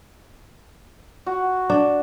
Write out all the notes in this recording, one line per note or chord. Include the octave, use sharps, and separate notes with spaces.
F#4
D4